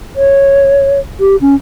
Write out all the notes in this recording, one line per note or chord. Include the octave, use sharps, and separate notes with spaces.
C#5
G4
C#4